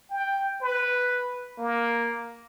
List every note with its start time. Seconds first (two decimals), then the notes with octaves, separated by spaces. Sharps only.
0.11 G5
0.61 B4
1.58 A#3